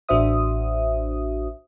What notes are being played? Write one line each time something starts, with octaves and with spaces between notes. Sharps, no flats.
A1 D4 F#4 C5 E5 D#6